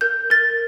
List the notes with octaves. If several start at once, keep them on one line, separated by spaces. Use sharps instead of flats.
A#4 G6
A#4 A6